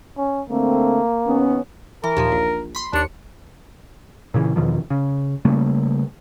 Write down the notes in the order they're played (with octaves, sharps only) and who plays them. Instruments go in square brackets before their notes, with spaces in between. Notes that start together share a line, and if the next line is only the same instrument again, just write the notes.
[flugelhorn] C#4
[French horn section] D3 A3 C4 [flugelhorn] A#3
[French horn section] D#2 B3 C#4
[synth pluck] E3 [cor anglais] A#4
[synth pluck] D#2 A#2 F3
A#1
B5 C6
[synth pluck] D#2 C#7 [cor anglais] D4
[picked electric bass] A#2 C#3 E3
E2 B2 D#3 F3
C#3
C#3 G3 A3 A#3